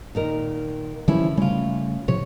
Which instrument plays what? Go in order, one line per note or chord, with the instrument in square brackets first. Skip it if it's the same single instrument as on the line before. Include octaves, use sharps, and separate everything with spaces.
[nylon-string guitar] A#2 D#3 A#4
[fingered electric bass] D3 E3 G3 [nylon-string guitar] F3 C#4 E4
[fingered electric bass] C#3 G3 A3 [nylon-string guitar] C#4 F4
[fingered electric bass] A2 C3 F3 [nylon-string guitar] C#5